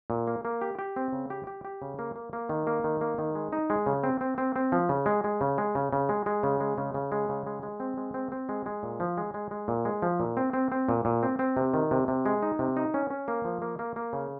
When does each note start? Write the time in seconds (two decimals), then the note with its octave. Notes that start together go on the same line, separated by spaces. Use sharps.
0.10 A#2
0.27 A#3
0.45 A#3
0.61 G4
0.79 G4
0.96 C4
1.13 C#3
1.30 G4
1.47 G4
1.65 G4
1.82 C#3
1.99 A#3
2.16 A#3
2.33 A#3
2.49 D#3
2.67 A#3
2.84 D#3
3.01 A#3
3.18 D#3
3.35 G#3
3.53 D#4
3.70 G#3
3.86 C#3
4.04 C4
4.21 C4
4.38 C4
4.56 C4
4.72 F3
4.89 C#3
5.06 G#3
5.24 G#3
5.41 C#3
5.58 G#3
5.75 C#3
5.93 C#3
6.09 G#3
6.26 G#3
6.43 C#3
6.60 G#3
6.78 C#3
6.94 C#3
7.12 G#3
7.29 C#3
7.47 G#3
7.63 G#3
7.80 C4
7.97 G#3
8.14 C4
8.32 C4
8.49 G#3
8.66 G#3
8.83 A#2
9.00 F3
9.17 G#3
9.34 G#3
9.51 G#3
9.68 A#2
9.85 G#3
10.02 F3
10.20 A#2
10.37 C4
10.53 C4
10.72 C4
10.89 A#2
11.05 A#2
11.23 C4
11.39 C4
11.57 C3
11.74 D#3
11.91 C3
12.08 C3
12.26 G#3
12.43 D#4
12.59 C3
12.77 D#4
12.94 C#4
13.10 C#4
13.28 A#3
13.45 F3
13.62 A#3
13.79 A#3
13.96 A#3
14.13 C#3